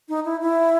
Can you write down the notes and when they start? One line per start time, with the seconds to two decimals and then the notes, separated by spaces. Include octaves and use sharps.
0.09 D#4
0.25 E4
0.41 E4